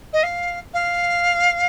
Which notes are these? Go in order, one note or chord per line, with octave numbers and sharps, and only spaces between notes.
D#5
F5
F5